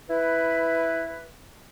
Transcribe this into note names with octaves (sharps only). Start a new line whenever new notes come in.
E4 B4